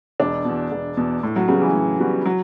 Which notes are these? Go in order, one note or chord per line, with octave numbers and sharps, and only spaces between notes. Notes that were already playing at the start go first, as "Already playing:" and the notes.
E1 D4
E2 B2
E1
E2 B2
A2
F#3
C#3 G3 B3 F#4
E3
A2
G3 B3 F#4
F#3